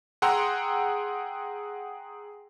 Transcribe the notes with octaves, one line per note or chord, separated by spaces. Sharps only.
G#4 F#5 G5 A#5 C6 E6